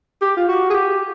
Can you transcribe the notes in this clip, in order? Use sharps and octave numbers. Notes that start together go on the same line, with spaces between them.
G4
F4
F#4
G#4
G4